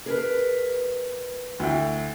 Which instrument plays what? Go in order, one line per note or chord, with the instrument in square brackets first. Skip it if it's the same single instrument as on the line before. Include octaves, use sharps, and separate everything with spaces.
[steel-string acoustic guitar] G#4 A#4 B4
[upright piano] D2 E4 G5